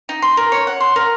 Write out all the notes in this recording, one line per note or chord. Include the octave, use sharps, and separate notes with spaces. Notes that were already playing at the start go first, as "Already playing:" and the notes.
D#4
C6
A#4
C#5
F#5
C6
A#4